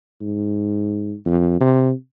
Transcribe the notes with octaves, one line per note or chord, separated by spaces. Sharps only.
G#2
F2
C3